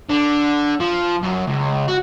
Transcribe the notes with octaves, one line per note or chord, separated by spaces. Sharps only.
D3
F3
F#2
C#2
F#4